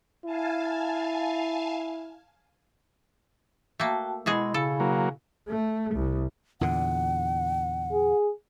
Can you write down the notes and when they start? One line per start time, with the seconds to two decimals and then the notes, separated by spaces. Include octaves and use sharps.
0.25 E4 F5 G#5 A5
3.80 A3 A#3 F#4 G5 A5
4.26 B2 G#3 E4 F#4 G#4 B5
4.54 C#3 A4
4.80 F#3 A#3
5.47 A3
5.95 C2
6.61 E2 A#2 D3 F#5
7.92 G#4